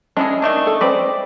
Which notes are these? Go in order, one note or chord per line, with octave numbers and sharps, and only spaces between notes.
G#3 C#4 D4 E4 G#4 D#5
D#3 A3 D4
A4
G#3 C4 B4 C5 D5